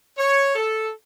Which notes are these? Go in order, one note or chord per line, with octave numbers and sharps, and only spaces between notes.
C#5
A4